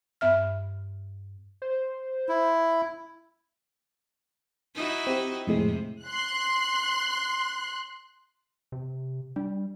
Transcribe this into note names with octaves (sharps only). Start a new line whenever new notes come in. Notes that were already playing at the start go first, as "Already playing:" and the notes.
G2 B3 E5 F6
C5
E4
D#4 E4 F#4
C4 G4
F2 A2 C3 G#3
C6 F#6
C3
G3 D4